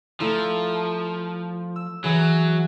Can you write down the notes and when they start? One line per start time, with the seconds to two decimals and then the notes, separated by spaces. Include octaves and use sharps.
0.20 F3 A3 E4 A#5
1.76 E6
2.04 E3 F#3 G#4